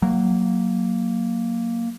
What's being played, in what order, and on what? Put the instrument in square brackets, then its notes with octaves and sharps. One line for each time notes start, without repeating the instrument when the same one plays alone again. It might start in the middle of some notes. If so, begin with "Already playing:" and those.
[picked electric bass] F#3 [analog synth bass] A#3